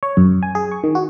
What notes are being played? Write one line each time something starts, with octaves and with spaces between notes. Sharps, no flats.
C#5
F#2
G#5
G#4
C#6
D#3
F#4